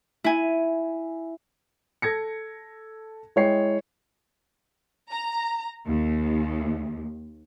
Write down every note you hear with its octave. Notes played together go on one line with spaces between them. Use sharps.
E4 G#5
A4 G#6 A#6 C#7
G#3 E4 C#5 G5 C7
A#5
D#2